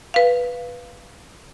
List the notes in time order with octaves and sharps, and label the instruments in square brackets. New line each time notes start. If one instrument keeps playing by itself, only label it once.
[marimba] B4 F5